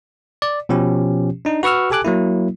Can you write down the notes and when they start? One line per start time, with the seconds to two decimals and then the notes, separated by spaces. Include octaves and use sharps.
0.42 D5
0.69 B2 F3 C#4 G4
1.45 D4 D#4
1.63 F#4 B4 C#6 E6 F6
1.91 G4 A4 G#5 D6 F#6
2.05 F#3 A#3 E4